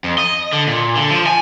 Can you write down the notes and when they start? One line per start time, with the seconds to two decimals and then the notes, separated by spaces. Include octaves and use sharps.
0.04 F2
0.18 D#5
0.53 D3
0.67 A#2
0.96 D3
1.11 F3
1.26 G#5